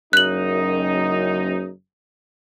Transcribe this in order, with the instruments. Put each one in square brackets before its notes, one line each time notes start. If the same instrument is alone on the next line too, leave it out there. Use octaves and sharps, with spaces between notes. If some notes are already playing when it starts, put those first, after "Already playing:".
[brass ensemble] F#1 F#2 D#4 [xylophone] F#6 F#7